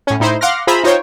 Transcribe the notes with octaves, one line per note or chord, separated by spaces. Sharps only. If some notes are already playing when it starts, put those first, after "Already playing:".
A2 C#4
A2 D#4 E4 C5
F5 F#5 C6 D6 F6 A#6
F4 G#4 C5 E5 A#5 B5
D#4 F4 C5 C#5 G5